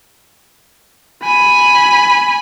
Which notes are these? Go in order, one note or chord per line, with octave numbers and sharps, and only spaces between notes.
G#5 B5